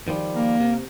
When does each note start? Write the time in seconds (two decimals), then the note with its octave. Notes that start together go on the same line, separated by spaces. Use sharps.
0.08 D#3 F3 G3
0.34 A#3
0.60 C3